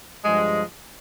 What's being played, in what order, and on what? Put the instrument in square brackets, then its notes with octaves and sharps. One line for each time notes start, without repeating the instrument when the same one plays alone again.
[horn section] G2 F3 G#3